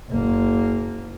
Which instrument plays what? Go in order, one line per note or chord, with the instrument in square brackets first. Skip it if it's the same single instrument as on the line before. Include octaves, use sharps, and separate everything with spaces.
[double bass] F#1 A#3